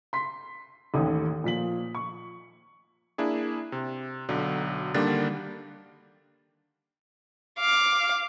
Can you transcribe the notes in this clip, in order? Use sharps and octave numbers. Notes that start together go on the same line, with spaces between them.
C6 B6
A1 D#2 A4 D#6
A#2 F3 B6 F#7
C#6
A#3 D4 E4 G#4
C3
B1 D3 F#3
D3 D#3 G3 A#3 D4 A6
F5 D6